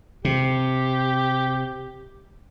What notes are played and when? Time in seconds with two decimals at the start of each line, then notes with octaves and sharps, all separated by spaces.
0.25 C3 G4